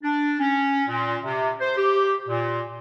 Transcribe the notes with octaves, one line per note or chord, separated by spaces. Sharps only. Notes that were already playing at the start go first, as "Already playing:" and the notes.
D4
C#4
A#2
C3
C5
G4
A#2